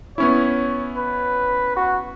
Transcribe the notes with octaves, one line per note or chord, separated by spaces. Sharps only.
B3 C#4 E4 C#5
B4
F#4